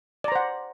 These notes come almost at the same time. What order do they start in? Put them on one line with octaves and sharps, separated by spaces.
D5 A#5 C5 F#5